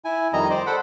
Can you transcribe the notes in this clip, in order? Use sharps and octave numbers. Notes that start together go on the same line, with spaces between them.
E4 G#5
F2 D#3 G3 D#5 A#5
C5 D5
A4 C5 F#5 B5